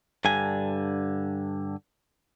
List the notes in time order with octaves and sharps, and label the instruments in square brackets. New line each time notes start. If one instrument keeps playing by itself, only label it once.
[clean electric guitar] G2 D3 G#5